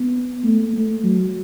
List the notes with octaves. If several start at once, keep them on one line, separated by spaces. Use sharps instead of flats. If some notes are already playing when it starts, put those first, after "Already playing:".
Already playing: B3
A3
A3
F#3